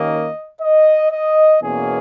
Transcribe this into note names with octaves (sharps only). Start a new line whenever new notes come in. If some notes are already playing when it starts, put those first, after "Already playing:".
Already playing: D#2 D#3 A#3 C#4 D#5
D#5
D#5
E2 B2 A#3 C#4 G#4